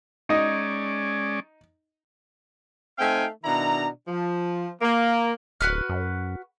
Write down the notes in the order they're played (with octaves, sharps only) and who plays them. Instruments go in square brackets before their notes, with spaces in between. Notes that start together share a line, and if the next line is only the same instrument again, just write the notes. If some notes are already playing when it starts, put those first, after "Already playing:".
[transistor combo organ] G#3 C#4 D5 [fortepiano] D#4 D#5
[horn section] A3 C4 D#4 F5 G5 G#5
B2 D#3 D4 E4 A#5
F3
A#3
[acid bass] D1 [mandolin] F#4 B4 F6
[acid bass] F#2